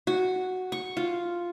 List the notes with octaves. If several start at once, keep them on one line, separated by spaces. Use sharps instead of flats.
F#4
C#6
F4